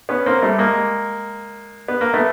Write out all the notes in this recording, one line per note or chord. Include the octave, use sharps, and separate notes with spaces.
B3 C#4
A#3 C4
G3 A3
G#3 A#3
B3
A#3
A3 B3